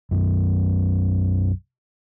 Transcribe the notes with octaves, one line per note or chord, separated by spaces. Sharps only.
B1 F#2